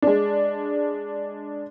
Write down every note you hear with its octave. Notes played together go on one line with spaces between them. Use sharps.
G#3 D4